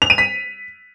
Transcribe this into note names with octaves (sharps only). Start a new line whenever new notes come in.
F7
D#7
B6